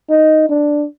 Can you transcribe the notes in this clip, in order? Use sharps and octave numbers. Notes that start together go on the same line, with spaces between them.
D#4
D4